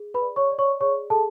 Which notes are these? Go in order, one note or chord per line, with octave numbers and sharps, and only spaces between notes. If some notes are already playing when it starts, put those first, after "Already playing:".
Already playing: G#4
B4 B5
D5
C#5 C#6
D5
C#5 C#6
G#4 C#5 C#6
G#4 A4 A5